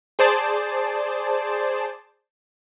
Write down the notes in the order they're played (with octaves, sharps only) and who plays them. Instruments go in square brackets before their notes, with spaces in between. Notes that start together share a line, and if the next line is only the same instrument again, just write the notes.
[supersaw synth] G#4 C5 D5 A5